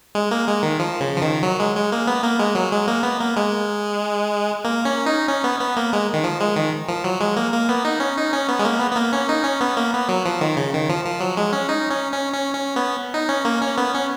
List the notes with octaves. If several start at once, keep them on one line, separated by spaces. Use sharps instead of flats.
G#3
A#3
G#3
D#3
F3
C#3
F3
D#3
F#3
G#3
G#3
A#3
B3
A#3
G#3
F#3
G#3
A#3
B3
A#3
G#3
A#3
C#4
D#4
C#4
B3
B3
A#3
G#3
D#3
F3
G#3
D#3
F3
F#3
G#3
A#3
A#3
B3
D#4
C#4
D#4
C#4
B3
G#3
A#3
B3
B3
A#3
C#4
D#4
C#4
B3
A#3
B3
F#3
F3
D#3
C#3
D#3
F3
F3
F#3
G#3
C#4
D#4
C#4
C#4
C#4
C#4
B3
D#4
C#4
A#3
C#4
B3
C#4